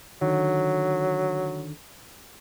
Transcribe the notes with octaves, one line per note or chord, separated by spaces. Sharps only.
D3 D#3 F#3